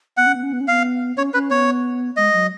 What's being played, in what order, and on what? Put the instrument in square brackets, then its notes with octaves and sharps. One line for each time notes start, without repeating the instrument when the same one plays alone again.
[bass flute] B3 [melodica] F#5
[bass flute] C#4
B3
C#4
B3
C#4
[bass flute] B3 [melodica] F5
[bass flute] C#4 [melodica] C#5
[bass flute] C#4 [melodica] B4
[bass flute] B3 [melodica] C#5
[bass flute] G#3 [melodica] D#5
[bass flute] F#3